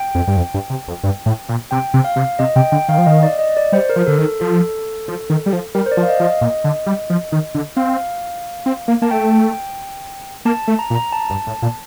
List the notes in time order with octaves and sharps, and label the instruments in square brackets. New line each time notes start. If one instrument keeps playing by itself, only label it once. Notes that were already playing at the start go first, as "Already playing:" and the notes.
Already playing: [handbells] G5
[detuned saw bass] F2
G2
F2
G2
C3
F2
G2
A2
A#2
[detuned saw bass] C3 [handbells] G5
[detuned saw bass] C3
[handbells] F5
[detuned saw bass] C3
[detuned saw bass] C3 [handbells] D#5
[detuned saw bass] C3 [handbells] G5
[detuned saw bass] D3 [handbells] G5
[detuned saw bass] D#3 [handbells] F5
[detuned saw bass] F3
[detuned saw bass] D#3 [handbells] D#5
[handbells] D5
D#5
D5
[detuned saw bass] G3 [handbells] C5
[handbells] A#4
[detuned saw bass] F3
[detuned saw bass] D3 [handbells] A4
[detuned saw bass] D#3
[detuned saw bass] F3 [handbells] A4
[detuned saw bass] F3
D#3
G3
F3
[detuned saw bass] G3 [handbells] A#4
[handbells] C5
D5
[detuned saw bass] F3
[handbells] F5
D#5
[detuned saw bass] F3
[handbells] D#5
[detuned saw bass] A#2
D3
G3
F3
D#3
D3
[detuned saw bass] C4 [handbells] F5
[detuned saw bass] C4
A#3
[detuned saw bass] A#3 [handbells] A5
[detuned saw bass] A3 [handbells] G5
[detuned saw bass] A#3 [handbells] A5
[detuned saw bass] A3
[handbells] A#5
[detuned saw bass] A#2
[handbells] A#5
A5
[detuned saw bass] G2
A2
A#2